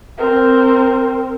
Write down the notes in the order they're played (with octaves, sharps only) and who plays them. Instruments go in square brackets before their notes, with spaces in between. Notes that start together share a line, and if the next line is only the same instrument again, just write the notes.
[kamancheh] C4 A#4